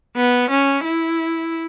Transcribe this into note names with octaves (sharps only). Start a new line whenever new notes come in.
B3
C#4
E4